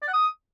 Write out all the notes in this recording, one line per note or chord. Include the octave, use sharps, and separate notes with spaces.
D5
F#5
D#6